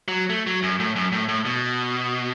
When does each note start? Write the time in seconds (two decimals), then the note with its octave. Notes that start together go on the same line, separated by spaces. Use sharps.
0.08 F#3
0.30 A3
0.47 F#3
0.63 F#2
0.80 A2
0.96 F#2
1.12 A2
1.28 A2
1.46 B2